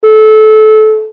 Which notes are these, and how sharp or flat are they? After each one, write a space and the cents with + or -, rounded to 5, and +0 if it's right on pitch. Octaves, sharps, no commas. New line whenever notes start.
A4 -25